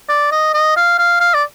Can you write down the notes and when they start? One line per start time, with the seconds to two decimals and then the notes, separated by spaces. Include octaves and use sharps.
0.09 D5
0.32 D#5
0.54 D#5
0.76 F5
0.98 F5
1.21 F5
1.34 D5